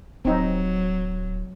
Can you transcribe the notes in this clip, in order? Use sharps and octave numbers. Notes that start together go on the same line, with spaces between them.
D1 F#3 C4 D#4